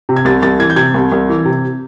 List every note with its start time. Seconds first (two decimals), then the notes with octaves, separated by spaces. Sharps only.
0.09 C3
0.16 G#6
0.25 C2 A6
0.42 C2 A6
0.59 E3 G#6
0.70 G6
0.76 C3 G#6
0.94 C2
1.12 C2
1.29 E3
1.45 C3